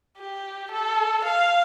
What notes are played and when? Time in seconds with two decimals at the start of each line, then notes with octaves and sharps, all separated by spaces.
0.18 G4
0.72 A4
1.24 F5